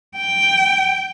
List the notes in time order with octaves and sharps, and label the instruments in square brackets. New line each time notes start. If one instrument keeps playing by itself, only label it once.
[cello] G5